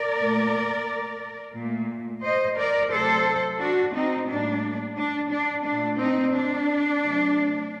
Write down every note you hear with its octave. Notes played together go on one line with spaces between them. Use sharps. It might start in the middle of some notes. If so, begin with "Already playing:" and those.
Already playing: A#4 D5
A#2 A3
A#2 A3
C5 D#5
A#4 D5
C3 F#3 A3 A4 C5
D4 F#4
C4 D#4
A2 G3 A#3 D4
D4
D4
A#2 A3 D4
C4 D#4
D4
C3 F#3 A3